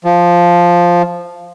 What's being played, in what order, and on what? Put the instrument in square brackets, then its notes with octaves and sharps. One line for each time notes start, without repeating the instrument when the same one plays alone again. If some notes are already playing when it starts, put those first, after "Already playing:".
[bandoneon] F3